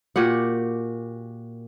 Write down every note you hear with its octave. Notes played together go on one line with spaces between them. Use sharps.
A#2 F#4 G4 F#5